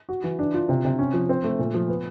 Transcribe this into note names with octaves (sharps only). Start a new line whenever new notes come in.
F#4
E3
D4
F4
C3
C3
C#4
F3
C4
A3
A#2
F3
B3